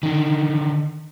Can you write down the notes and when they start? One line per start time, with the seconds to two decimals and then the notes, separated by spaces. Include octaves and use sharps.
0.03 D3 D#3